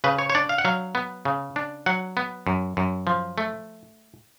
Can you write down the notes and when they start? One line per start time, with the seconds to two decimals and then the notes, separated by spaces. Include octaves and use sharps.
0.04 C#3 B4
0.19 C#5
0.30 C#5
0.35 D4 D5
0.49 F5
0.58 F#5
0.65 F#3 F5
0.95 B3
1.25 C#3
1.56 D4
1.86 F#3 F#5
2.17 B3
2.47 F#2
2.77 F#2
3.07 F3
3.38 A3